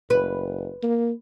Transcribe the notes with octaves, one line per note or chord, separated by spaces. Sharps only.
F#1 B4
A#3